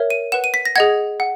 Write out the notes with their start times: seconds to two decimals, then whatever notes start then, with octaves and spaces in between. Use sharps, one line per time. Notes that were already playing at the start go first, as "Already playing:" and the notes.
Already playing: A#4 C#5 E5
0.10 D#7
0.32 B4 F#5 E7
0.44 D#7
0.54 B6
0.65 A#6
0.76 G#4 D#5 F#5 G#6
1.20 F#5